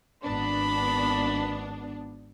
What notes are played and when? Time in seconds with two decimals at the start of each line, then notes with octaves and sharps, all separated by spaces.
0.23 G#1 B3 D4 B5